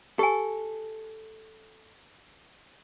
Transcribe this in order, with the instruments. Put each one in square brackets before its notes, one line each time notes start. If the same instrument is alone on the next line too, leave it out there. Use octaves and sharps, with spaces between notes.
[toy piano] G4 G#5 [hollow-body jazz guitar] A4